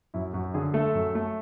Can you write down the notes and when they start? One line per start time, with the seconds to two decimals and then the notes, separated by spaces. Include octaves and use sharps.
0.14 F#2 E4
0.33 F#2 F#4
0.54 D3 G#4
0.74 A3 A4
0.94 F#2
1.15 A3